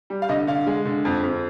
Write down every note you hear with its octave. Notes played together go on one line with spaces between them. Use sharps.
G3
F5
D3 D#5
D3 F5
G#3
D3
F2
F2